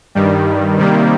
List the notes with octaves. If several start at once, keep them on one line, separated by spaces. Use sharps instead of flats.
G2 D#3 G3
C3 D#3 G3 A#3